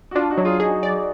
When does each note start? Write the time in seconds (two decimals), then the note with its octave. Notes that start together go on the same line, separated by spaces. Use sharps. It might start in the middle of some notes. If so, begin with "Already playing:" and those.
0.11 F#4
0.15 D4 F4
0.30 D#4 F#4
0.38 F#3
0.45 F4 G#4
0.60 D#4 F#4 G#4
0.83 D5